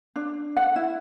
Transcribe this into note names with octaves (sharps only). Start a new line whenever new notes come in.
D4
F#5
E4